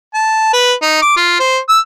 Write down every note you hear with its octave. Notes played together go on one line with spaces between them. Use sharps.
A5
B4
D#4
D6
F4
C5
E6